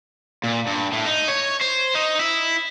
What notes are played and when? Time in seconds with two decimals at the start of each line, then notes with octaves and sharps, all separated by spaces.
0.44 A#2
0.67 G2
0.92 A2
1.05 D#4
1.28 C#5
1.61 C5
1.95 D#4
2.19 E4